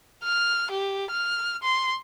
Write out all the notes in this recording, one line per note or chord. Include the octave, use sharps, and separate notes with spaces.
F6
G4
F6
C6